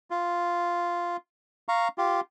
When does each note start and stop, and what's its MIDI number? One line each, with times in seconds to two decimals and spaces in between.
0.10 1.17 65
1.68 1.88 77
1.68 1.88 82
1.68 1.88 85
1.98 2.21 65
1.98 2.21 67